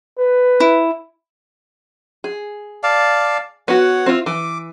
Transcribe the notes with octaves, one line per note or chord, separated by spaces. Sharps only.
B4
E4
G#4
D5 F5 A5
B3 F#4 C#5 F#5
C4 E4 F4
E3 D6